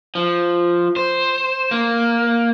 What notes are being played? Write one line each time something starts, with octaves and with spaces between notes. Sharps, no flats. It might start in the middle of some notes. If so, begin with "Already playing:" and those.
F3
C5
A#3